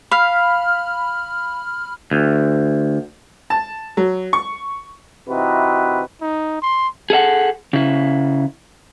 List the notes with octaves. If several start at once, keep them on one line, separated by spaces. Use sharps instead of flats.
F5 B5 F6
D2
A5
F#3
C#6
C3 E3 D#4 E4 F#4 B4
D#4
C6
G#4 A4 E5 F#5
C#3 E4